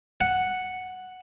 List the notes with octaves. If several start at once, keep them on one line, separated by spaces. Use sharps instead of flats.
F#5